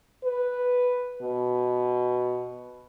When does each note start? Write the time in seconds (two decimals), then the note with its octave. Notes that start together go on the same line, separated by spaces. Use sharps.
0.24 B4
1.22 B2